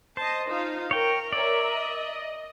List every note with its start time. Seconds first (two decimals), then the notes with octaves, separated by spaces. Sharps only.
0.17 C5 D#5 A5
0.50 D#4 F4 F5
0.91 A#4 C#5 G5
1.33 A#4 C#5 D5 E5
1.70 D#5